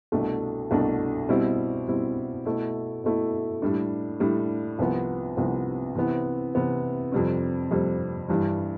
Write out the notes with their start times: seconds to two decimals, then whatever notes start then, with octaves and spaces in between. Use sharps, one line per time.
0.12 C2 B2 A3 D4
0.70 C2 B2 A3 D4
1.29 B2 G3 C4 E4
1.87 B2 G3 C4 E4
2.45 B2 A3 E4
3.04 B2 A3 E4
3.62 A2 G3 D4
4.20 A2 G3 D4
4.79 C2 C3 F3 B3
5.37 C2 C3 F3 B3
5.95 C3 E3 B3 E4
6.54 C3 E3 B3 E4
7.12 F2 C3 G3 C4
7.71 F2 C3 G3 C4
8.28 G2 E3 G3